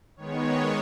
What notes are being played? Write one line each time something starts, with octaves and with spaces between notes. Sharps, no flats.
D#3 G#3 B3 C#5